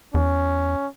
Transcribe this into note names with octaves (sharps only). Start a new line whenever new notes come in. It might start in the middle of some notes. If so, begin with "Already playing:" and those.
E2 C#4